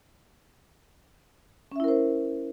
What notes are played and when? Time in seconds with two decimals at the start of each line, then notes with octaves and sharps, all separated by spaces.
1.72 C#4
1.76 E5
1.80 E4
1.84 A#4
1.88 C5